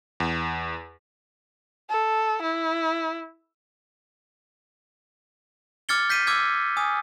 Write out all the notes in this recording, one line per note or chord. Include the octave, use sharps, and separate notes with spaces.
E2
A4
E4
D6 F6 G#6 A6 C#7 G7
G6 B6 C7 D#7
D6 E6 F6 G#6
G#5 D#6